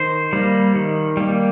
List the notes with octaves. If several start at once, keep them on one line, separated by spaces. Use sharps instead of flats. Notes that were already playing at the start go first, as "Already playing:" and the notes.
Already playing: D#3 C5
G3 A#3
D#3
G3 A#3